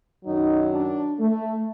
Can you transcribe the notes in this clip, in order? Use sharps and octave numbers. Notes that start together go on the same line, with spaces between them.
F#2 D#3 F#3 D#4
D4
A3